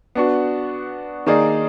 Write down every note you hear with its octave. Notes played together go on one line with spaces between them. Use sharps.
B3 D4 F#4
D#3 A#3 D#4 G#4 D5